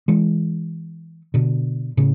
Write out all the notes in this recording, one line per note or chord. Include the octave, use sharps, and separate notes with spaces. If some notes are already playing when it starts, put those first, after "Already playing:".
E3 G#3
B2 D3
A2 C#3